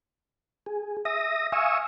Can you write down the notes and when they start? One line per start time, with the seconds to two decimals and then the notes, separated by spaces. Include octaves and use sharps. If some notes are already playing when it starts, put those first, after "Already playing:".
0.66 G#4
1.05 E5 D#6 A#6
1.52 E5 F5 G#5 C#6 D#6 E6